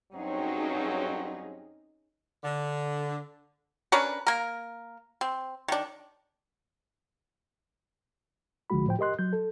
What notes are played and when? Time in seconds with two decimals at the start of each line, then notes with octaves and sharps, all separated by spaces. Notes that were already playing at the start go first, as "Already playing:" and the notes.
0.13 G2 F#3 C4 C#4 D#4 G#4
2.43 D3
3.92 C#4 D4 A#4 B4
4.27 A#3 A#4
5.21 C4
5.68 D#3 D4
8.70 C2 D3 F3 G#3 F#4 B5
8.86 A2 F3 C5 G5
8.99 G4 A#4 D#5 C6 F#6
9.19 F#3 G6
9.33 A4